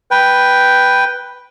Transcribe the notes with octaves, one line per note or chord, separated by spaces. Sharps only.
B4 G5